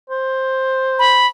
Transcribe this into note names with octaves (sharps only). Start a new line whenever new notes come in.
C5
B5